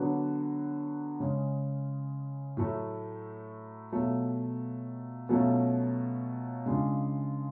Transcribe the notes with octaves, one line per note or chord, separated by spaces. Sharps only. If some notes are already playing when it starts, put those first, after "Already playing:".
Already playing: D3 F#3 B3 D4 F#4
C#3 G#3 C#4
A2 F#3 A3
B2 F#3 A3 F4
B2 F#3 A3 C#4 F4
C#3 G#3 D4 F4